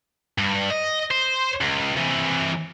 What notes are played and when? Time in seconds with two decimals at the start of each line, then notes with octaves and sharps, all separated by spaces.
0.38 G2
0.70 D#5
1.11 C5
1.61 C#2
1.97 C3 E3